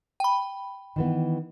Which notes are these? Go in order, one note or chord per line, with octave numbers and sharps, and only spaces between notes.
G5 B5
D#3 E3 B3